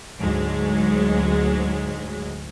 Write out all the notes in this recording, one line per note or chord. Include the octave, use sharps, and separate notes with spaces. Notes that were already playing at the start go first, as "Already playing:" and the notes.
D2 G#2 F#3 G#3